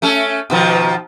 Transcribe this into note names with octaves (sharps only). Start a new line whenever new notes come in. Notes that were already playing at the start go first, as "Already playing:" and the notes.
A3 C#4 A4
B2 D#3 F3